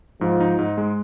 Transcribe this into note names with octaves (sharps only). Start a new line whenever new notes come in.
G#2 F3
D#4
G#2
G#3